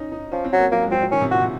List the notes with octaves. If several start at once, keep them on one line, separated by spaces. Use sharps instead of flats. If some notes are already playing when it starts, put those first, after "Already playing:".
Already playing: C#4 D#4
D#4
F3 C#4
C4
F#3
A#3
F#3 A#3
G#3
F#3 C4
F#3
D#3 C#4
C3
A#2 F#4
C3